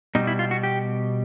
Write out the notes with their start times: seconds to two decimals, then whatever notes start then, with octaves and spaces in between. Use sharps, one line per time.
0.15 B2 G3 D#4
0.27 E4
0.39 F4
0.51 F#4
0.63 G4